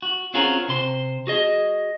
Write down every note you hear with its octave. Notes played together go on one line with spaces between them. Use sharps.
F#4
C4 C#4 F4 F#4 G#4 A#4
C3 C5 C6
F#4 G#4 D#5